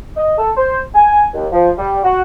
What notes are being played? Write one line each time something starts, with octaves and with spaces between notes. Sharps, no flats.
D#5
A4
C5
G#5
D#2
F3
G3
F#4